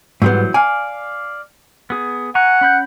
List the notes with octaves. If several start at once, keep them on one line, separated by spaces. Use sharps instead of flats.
G#2 E3 F#3 G3 B3 C5
D5 F5 G#5
B3 G#4
F#5 G#5 A#5 C#6
C#4 B5 G6